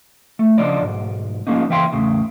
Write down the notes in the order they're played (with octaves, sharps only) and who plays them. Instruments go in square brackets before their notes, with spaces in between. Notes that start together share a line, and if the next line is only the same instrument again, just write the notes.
[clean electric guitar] A3
C#3 F3 D4 D5 D#5
B1 G#2
F3 F#3 G#3 A#3 C#4 D#4
C#2 E3 E5 F5 G5 C6
E2 A2 C#3